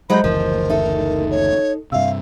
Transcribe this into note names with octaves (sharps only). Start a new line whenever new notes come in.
F#3 G#3 F#4 C5 D#5 B5 G6
F#1 D2 E3 F3 A#4
D#4 A4 E5
C#5
G2 C3 E5 F5 E6